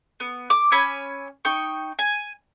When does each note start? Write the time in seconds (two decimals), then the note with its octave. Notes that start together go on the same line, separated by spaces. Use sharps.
0.20 B3
0.50 D6
0.72 C#4 G#5 B5 E6
1.45 D#4 G5 C#6
1.99 G#5